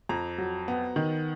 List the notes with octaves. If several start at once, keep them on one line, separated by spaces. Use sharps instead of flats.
F2 A#5
F#3
B3
D#3